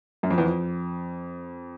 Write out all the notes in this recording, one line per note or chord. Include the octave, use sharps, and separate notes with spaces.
F#2
F2
E2
F2